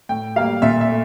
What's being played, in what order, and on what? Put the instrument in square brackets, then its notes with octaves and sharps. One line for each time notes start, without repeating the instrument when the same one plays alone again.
[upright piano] A2 G5
G3 A#3 F5
A#2 E5
E5
A3